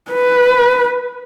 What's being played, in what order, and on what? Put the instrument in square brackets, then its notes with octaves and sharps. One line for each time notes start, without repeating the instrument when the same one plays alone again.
[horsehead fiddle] B4